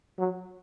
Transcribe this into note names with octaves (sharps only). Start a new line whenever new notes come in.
F#3